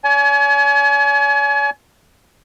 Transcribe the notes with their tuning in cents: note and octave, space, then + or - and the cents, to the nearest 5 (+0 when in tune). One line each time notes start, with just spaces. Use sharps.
C#5 +45 G#5 +35